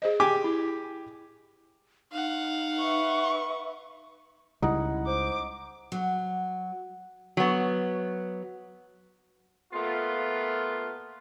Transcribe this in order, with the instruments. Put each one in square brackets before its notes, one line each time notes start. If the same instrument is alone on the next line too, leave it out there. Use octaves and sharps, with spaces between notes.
[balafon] G#4 C5 D#5
[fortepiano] G4 G#5 D6
[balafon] E4
[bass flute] D#4 [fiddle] F5 F#5
[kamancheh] B4 E5 [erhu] C#6
[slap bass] C#2 C#3 G3 [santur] D#4 F#5 [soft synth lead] E4
[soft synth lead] C5 [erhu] D6
[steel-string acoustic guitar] F#3
[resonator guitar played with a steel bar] F#3 B3
[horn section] A#2 A3 B3 F4